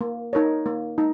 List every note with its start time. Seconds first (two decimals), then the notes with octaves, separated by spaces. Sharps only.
0.01 A#3
0.33 D#4 A#4 C#5
0.66 A#3
0.98 D#4